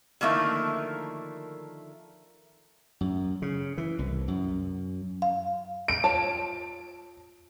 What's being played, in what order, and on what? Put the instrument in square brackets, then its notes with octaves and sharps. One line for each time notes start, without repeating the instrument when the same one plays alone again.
[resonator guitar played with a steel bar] D3 D#3 F3 A3 A#3 E4
[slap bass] F#2
C#3
E3
C2
F#2
[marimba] F5
[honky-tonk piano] D7
[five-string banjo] F4 C#5 A5